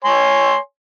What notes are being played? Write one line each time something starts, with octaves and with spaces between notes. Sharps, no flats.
C#5 G#5 C6